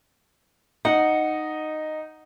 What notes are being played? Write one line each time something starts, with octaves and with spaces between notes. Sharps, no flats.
D#4 F#5